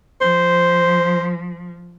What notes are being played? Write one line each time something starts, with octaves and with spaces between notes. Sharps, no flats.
F3 C5